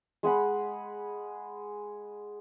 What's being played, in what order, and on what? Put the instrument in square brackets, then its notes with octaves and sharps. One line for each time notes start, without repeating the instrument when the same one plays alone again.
[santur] G#3 G#4 F#5 B5